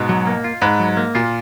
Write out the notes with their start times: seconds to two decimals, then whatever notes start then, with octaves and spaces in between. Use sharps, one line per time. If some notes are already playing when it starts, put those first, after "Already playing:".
Already playing: G#2 B2
0.09 F#3
0.27 A#3
0.44 F4
0.62 G#2 B4
0.80 F#3
0.97 A#3
1.15 A#2 F4